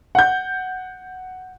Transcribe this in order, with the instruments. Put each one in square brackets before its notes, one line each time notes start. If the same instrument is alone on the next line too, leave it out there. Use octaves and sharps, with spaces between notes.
[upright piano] F#5 G6